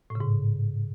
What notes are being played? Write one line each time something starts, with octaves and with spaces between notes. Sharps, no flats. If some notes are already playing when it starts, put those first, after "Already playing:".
A2
C#3
G#2